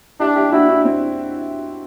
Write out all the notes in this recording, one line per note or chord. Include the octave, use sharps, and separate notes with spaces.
D4 E4 G4
E4 G4
D4 E4 F#4
D4 F#4
C4 E4